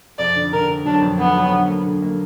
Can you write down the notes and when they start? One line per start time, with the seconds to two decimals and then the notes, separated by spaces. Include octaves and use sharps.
0.19 F2 D5
0.36 D3
0.53 D3 A#4
0.69 D3
0.85 F#3 D4
1.02 F2
1.19 D3 B3
1.36 F#3
1.52 D3
1.68 A#3
1.85 D3
2.02 A#3